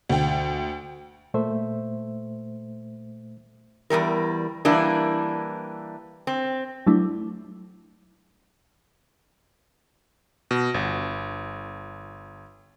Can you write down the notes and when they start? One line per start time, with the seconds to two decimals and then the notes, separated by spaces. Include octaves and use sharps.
0.09 D2 G5
1.34 A#2 A3 C5 E5
3.90 E2 C#3 G3 A#4
4.65 E3 G3 A#3 D4
6.27 C4
6.87 F#3 A3 D4 E4
10.51 B2
10.74 G1